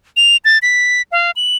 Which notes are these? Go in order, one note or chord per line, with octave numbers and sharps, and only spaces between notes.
F7
A6
B6
F5
F#7